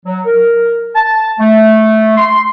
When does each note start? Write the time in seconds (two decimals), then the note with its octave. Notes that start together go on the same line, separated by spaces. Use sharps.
0.06 F#3
0.26 A#4
0.95 A5
1.40 A3
2.17 C6